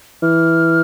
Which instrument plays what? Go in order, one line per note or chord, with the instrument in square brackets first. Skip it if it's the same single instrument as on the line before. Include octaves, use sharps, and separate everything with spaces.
[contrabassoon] E3 [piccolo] F6